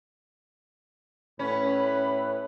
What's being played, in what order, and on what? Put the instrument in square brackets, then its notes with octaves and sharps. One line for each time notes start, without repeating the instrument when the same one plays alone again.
[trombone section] A2 B4 [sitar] C#4 [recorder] B5